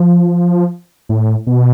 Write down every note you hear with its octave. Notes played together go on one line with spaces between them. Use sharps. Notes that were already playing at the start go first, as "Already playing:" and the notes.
Already playing: F3
A2
B2